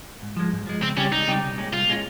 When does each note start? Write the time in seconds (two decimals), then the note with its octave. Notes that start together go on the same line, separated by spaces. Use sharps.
0.22 G#2
0.36 F3 G#3
0.53 G#2
0.67 F3 G#3
0.82 C#2 C4
0.97 C#3 G3 C4 C#4 G4
1.12 C#2 D#4
1.27 C#3 G3 C4 G4
1.43 C2
1.58 A#2 G#3 C#4
1.73 C2 F4
1.87 A#2 G#3 C#4